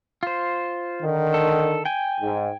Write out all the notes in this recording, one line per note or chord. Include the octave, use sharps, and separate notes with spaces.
F4 C5
D3 D#3
A4
G5 G#5
G#2